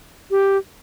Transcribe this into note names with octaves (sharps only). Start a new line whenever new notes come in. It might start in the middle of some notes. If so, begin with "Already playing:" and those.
G4